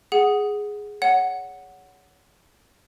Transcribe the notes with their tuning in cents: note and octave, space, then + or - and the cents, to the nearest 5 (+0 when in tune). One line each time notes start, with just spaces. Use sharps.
G#4 +0 F#5 +0
C#5 +25 F#5 +0